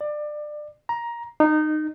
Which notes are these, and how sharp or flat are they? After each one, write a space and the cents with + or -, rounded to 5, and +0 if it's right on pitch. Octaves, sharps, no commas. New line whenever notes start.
D5 +25
A#5 +15
D#4 -20